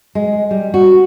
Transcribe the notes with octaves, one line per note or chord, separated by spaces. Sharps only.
G#3
G3
F#4